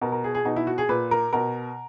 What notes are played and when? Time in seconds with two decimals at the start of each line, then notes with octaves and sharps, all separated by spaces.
0.01 B2 A#4
0.12 A#4
0.24 G#4
0.35 G#4
0.45 B2 D#4
0.56 E4
0.67 F#4
0.78 G#4
0.89 A#2 B4
1.11 A#4
1.33 B2 A#4